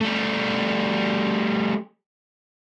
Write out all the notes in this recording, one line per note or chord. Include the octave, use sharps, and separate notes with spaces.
G3 A3